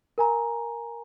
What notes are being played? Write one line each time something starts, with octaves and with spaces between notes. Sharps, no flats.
A#4 G#5 A#5